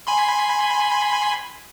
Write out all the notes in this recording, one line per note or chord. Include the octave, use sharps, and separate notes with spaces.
G#5 B5 C6